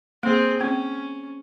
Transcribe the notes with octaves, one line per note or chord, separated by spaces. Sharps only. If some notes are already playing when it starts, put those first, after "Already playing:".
A#3 C4 G#4
C4 C#4